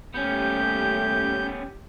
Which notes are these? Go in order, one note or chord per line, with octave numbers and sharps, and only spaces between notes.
D#2 G3 A3 B3 C#4 G4 G6